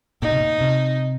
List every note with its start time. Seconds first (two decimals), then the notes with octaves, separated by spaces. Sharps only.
0.22 A#2 D#4
0.32 C3
0.41 A#2
0.61 C3